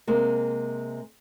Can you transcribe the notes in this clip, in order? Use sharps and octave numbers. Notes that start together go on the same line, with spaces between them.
C3 G#3 A#3